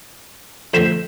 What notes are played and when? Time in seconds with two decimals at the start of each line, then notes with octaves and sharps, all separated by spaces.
0.74 F2 D3 A3 C5 E5